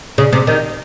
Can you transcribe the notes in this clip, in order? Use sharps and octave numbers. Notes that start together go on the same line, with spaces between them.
C#3
C3
D#3